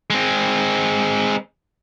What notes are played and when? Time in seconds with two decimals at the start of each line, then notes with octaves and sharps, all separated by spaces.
0.10 G#3 C4